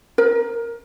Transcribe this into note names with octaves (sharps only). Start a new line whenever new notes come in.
A#4